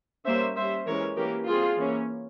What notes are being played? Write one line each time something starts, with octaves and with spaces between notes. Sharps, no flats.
G3 A#3 C#4 C5 E5
G3 C#4 C5 E5
E3 G#3 C#4 A#4 C#5
E3 A#3 C#4 G4 A#4
G3 C4 F4 G#4
E3 A#3 C#4